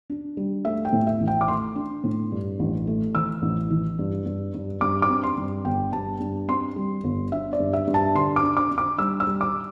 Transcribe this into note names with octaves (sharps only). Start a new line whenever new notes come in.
D4
G3
A3 E5
G5
A2
E5
A1
G5
D6
A3 C6
D4
A2
G2
A1
A3
E3 E6
A1
E3
G2
G2
G2
G2 D6
D6
C4
C6
G2
G1 G5
G2 A5
G2
C4 C6
G3
G1
D4 E5
D5
G2
E5
G2
A5
D3 C6
D6
D4
D6
D4
D6
G3 E6
E6
G3
D6